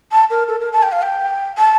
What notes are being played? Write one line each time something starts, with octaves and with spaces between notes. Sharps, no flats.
A5
A#4
A4
A#4
A5
G5
F5
G5
A5